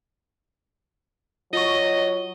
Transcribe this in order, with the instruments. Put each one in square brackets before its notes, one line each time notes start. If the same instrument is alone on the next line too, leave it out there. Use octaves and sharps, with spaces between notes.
[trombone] F#3 [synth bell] F4 C#6 [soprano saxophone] D#5